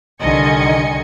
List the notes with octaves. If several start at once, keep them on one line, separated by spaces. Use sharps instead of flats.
C2 D3 D#3 D#5 G#5 C#7